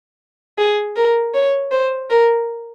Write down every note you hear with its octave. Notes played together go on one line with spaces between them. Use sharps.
G#4
A#4
C#5
C5
A#4